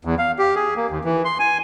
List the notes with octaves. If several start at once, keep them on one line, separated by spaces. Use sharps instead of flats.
E2
F5
G4
G#4
A#3
D#2
E3
C6
G#5